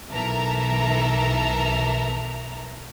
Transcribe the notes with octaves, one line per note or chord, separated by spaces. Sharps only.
B1 E3 A4 A#4 E5 A#5